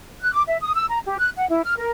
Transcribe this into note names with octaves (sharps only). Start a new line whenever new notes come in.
F#6
D6
E5
D#6
E6
A#5
G4
F#6
F#5
E4
F6
A#4